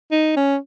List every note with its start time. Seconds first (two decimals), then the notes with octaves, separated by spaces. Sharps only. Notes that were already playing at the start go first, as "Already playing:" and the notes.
0.11 D#4
0.36 C#4